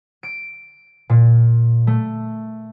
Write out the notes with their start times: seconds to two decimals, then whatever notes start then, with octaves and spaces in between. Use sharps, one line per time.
0.23 D7
1.09 A#2
1.87 A3